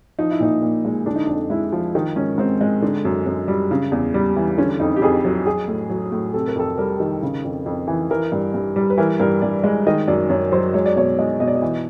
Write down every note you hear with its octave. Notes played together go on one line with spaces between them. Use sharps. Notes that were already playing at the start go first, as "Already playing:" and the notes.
F3 D#4
E4
A#2 D#4
A#2
G#3
D3 D4
D#4
D4
F2
G#3 E4
F3
D#3 D#4
G#2 C#4
G#2 C4
G#3
D3
F#2
F#2
G3
C#3
E2
G3
E3
D3 C#4
F2 D#4
G4
F2 G#4
F#3
F#3 G#4
A2
F#3
A2
C3 A4
A#4
F2 A4
G3 A#4
D#3
C#3
F2
F2
E3
E3 A#4
G2
G2
G3
B4
E3 A#4
G2 A#4
G2 D5
G#3
D#3 D#5
F#2 D5
F#2 C#5
F#3 C5
G#3 C#5
D5
B2 C#5
G#3 D#5
B2 D#5
D5
D#5
E3